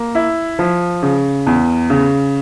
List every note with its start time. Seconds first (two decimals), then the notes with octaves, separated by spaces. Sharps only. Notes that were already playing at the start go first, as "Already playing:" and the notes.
Already playing: A#3
0.15 E4
0.59 F3
1.03 C#3
1.47 E2
1.90 C#3